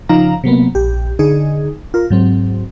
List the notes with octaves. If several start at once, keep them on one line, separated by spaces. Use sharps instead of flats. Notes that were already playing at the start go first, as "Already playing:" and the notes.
C#3 F3 D#4 F5 A#5
C3 F#3 A#3 B3
A#1 G4
D3 D#4 G#4
F4 A#4
G#2 F#3 C4